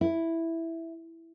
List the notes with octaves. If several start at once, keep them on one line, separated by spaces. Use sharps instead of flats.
E4